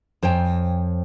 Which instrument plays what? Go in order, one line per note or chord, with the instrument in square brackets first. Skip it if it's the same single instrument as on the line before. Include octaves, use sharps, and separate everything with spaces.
[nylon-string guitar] F2 C5 C#5 G5 G#5